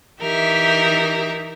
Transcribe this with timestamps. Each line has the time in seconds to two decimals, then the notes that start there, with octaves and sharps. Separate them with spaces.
0.22 E3 D#4 G4 A#4 E5